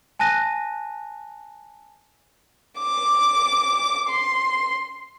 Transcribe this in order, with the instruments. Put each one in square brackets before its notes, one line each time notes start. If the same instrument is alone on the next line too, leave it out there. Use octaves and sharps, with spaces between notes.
[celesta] G#5 A5 F#6 A#6 D#7
[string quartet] D6
C6